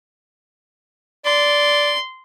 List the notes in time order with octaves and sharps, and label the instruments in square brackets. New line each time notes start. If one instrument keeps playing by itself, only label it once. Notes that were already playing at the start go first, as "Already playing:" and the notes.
[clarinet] D5 [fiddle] C6